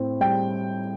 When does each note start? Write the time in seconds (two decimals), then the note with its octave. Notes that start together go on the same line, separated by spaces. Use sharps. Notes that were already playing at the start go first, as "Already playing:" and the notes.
Already playing: A2 C4
0.20 G3 G5